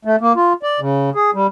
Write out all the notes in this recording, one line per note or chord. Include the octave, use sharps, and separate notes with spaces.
A3
A#3
F4
D5
C#3
G#4
G3